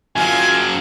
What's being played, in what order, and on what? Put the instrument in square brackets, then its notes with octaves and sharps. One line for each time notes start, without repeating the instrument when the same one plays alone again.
[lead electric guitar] F#2 A#3 [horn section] F4 G#5